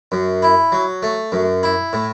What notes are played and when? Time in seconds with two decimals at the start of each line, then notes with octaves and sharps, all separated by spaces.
0.12 F#2
0.42 E4
0.72 F#3
1.03 A3
1.32 F#2
1.63 E4
1.93 A2